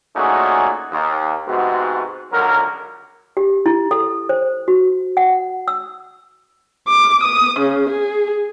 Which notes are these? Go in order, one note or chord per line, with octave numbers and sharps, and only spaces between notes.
A#2 A3 C#4 D#4 F#4 G#4
D#2
G#2 C3 G#3 B3 F#4
C#2 D3 F#3 A#4
G4
E4
A4
C5
F#4
F#5
E6
D6
D#6
C#3
G#4